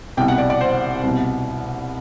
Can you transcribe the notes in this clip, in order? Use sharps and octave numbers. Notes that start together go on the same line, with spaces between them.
C2 B2 G5
F#5
D5
D5
C5
C2 B2